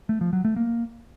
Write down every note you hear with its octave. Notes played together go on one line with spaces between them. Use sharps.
A3
F3
F#3
A3
A#3